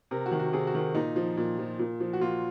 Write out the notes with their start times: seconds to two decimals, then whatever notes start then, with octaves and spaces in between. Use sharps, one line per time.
0.11 C3 A#4
0.26 F#4
0.32 D#3
0.39 F#4
0.53 C3 G#4
0.67 F#4
0.75 D#3
0.95 A#2 D#4
1.16 F3
1.37 A#2
1.59 F3
1.79 A#2
2.00 F3
2.13 F#4
2.21 A#2 F4